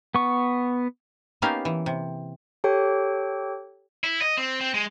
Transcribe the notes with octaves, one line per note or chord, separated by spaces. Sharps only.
B3 C#6
A#3 B3 C#4 D#4 G4 F5
E3
C3
G4 A4 C#5 G5
E4
D#5
C4
C4
G#3